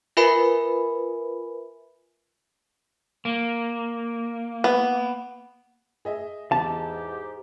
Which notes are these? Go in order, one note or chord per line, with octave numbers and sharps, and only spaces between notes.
F4 A#4 B4 E5 G#5 B5
A#3
B3
G#4 D#5 E5
E2 G#2 G4 A5